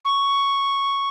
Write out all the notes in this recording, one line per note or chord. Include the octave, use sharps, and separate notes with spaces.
C#6